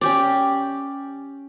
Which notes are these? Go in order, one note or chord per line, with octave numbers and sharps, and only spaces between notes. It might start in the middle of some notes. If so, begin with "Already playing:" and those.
C#4 G4 D5